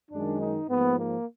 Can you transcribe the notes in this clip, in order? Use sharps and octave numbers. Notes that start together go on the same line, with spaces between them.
F#2 D#3 G#3 D4
D#4
G#2 F3 A#3 B3
A#3